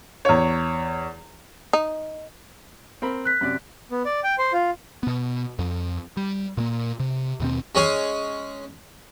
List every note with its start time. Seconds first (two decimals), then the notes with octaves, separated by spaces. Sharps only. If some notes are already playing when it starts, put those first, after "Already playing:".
0.25 E2 C#5
1.73 D#4
3.02 C4 A#4 B5
3.25 F#6 B6
3.41 F#2 C3 D5
3.91 B3
4.05 D5
4.24 G5
4.39 C5
4.53 F4
5.03 B2 B3
5.59 F2
6.17 G3
6.57 A#2 A#3
7.00 C3
7.40 D#2 B2 C4
7.75 G#3 C#4 G#4